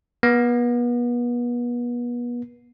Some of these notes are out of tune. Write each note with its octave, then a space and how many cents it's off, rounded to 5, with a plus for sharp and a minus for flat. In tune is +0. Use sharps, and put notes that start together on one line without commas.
B3 -35